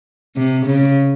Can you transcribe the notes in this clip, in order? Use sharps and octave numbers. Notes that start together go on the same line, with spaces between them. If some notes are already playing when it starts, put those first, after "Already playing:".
C3
C#3